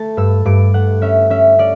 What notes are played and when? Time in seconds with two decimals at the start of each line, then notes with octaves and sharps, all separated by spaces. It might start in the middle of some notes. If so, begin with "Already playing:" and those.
Already playing: A3 A5
0.17 G2 E6
0.45 G2 D6
0.74 A3 F#5
1.02 C#4 E5
1.30 C#4 E5
1.58 C#4 D5